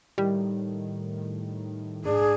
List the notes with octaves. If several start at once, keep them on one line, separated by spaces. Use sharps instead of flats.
A2 D#3 G3
G#2 D4 G#4